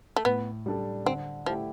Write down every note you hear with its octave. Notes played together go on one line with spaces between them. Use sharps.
A3
A2 B3
G3 D4 A4
D3 C4
F3 A3 E4 G4